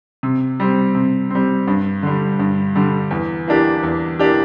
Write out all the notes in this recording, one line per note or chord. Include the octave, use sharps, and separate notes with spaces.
C3
G3 C4
C3
G3 C4
G2
D3 G3
G2
D3 G3
E2
E3 A#3 D4 G4
E2
E3 A#3 D4 G4